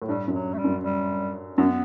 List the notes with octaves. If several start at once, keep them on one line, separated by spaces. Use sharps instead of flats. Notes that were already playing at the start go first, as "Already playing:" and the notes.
A2
G2 G3
F#2
F#3
A3
G3
F#2
G3
F#2 B3